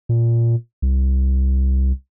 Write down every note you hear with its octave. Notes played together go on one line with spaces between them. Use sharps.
A#2
C2